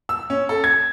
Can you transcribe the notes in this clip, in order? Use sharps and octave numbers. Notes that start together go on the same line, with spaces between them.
E6
C#4
A4
G#6